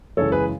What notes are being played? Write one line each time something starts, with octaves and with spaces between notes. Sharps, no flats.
F#2 C#3 E3 G#3 A4 C#5
G#4 B4